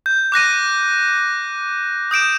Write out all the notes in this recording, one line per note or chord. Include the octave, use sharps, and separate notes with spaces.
G6
D6 F#6 A#6 D#7
D#6 G6 D7 E7